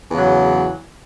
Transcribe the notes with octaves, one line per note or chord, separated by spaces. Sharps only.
E2 C#3 F#3